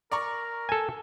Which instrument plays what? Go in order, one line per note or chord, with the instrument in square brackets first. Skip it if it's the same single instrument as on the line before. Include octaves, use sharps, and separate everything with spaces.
[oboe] A#4 [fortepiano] D5 A#5 C#6
[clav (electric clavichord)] A4 G#5